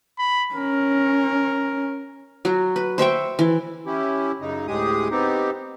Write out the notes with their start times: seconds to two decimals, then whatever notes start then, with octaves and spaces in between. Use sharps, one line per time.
0.18 B5
0.55 C#4 A#4
2.45 F#3 F#4
2.76 B4
2.98 C5 E5 G5 C#6
3.39 E3
3.86 C#4 E4 G4
4.41 F#2 C#3 D#4
4.68 D2 A2 G#3 G4 G#4 D#6
5.11 B3 C4 D#4 G4